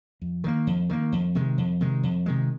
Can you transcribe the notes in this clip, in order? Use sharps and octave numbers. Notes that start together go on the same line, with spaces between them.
F2
D#3 G3 A#3
F2
D#3 G3 A#3
F2
C3 D#3 G#3
F2
C3 D#3 G#3
F2
C3 D#3 G#3